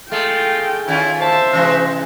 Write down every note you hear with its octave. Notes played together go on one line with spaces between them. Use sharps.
G#3 A3 F4 G5
D#3 C#4 E4 F4
C5 E5 A5
C3 E3 G#3 F#4